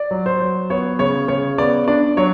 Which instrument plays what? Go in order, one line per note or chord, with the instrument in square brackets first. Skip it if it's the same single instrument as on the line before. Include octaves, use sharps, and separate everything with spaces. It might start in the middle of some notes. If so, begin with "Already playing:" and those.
Already playing: [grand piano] D5
F#3
C5
F#3
B3 C#5
C#3 C#5
C#3 C#5
B3 D5
D4 D5
F#3 C#5